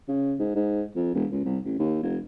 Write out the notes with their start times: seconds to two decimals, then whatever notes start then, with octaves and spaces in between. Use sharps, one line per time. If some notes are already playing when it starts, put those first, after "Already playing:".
0.09 C#3
0.39 G#2
0.55 G#2
0.96 F2
1.15 E1
1.31 C#2
1.45 C2
1.65 A1
1.79 D#2
2.03 F1